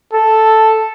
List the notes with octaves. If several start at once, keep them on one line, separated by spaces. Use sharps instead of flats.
A4